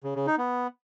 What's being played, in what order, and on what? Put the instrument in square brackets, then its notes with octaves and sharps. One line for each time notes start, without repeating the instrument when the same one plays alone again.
[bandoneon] C#3
C#3
D#4
B3